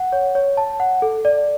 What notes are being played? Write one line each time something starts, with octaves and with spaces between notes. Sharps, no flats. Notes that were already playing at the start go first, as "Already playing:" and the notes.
Already playing: F#5
C#5
C#5
A5
F#5
A4
D5